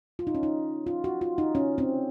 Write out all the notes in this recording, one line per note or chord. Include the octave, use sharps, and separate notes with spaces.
F4
D#4
C#4
D#4
F4
F#4
F4
D#4
C#4
C4